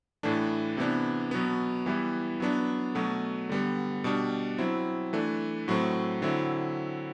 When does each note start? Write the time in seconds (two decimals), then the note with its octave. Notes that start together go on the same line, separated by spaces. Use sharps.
0.23 A2 E3 A3 D4
0.77 C3 E3 B3 D4
1.31 B2 F#3 B3
1.86 E3 G3 B3 E4
2.40 F#3 B3 D4
2.95 B2 F#3 A3
3.49 D3 G3 B3
4.04 B2 G3 D4
4.58 F#3 C4 E4
5.13 E3 A3 D4
5.68 A2 F#3 A3 C4
6.22 D3 F#3 C4 E4